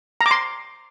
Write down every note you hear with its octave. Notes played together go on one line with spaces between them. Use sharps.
A#5
D6
C6